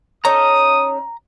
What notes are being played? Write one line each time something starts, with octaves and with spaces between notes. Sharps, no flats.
C#4 D#4 A4 A#5 D#6